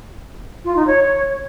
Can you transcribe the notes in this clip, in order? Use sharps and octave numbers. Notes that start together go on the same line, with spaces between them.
F4
D#4
C#5